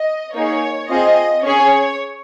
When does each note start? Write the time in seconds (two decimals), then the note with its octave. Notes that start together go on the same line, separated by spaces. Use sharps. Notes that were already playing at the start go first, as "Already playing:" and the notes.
Already playing: D#5
0.33 A#3 D#4 G#4 C#5
0.89 C4 F4 G#4 D#5
1.44 C#4 G#4 C#5